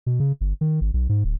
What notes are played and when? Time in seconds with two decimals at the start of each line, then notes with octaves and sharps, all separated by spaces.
0.06 B2
0.20 C#3
0.41 G1
0.61 D#3
0.81 G#1
0.94 B1
1.09 G#2
1.24 D1